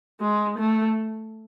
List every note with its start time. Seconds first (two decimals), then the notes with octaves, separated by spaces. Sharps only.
0.21 G#3
0.58 A3